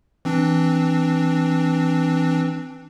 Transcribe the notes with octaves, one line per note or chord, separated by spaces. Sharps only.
E3 C4 D4